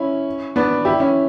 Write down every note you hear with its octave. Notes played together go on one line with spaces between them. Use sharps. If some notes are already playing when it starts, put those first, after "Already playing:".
Already playing: C#4 E4
B3 D4
E4 G4
C#4 E4